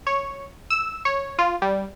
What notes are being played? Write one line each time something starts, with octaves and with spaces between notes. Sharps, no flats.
C#5
E6
C#5
F4
G3